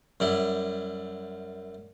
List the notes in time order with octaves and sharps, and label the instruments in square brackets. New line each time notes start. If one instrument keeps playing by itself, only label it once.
[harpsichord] F#2 G3 E4